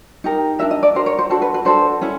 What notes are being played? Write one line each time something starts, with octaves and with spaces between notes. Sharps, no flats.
D#4 G4 A#4
D4 F#4 A#4 E5
D#5
D5
D4 F#4 A#4 C5
C#5
C5
D4 F#4 A4 C5
B4
B4
D4 F#4 A4 C5
C#4 E4 A4